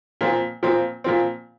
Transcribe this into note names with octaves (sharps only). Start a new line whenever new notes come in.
A#2 F3 C4
A#2 F3 C4
A#2 F3 C4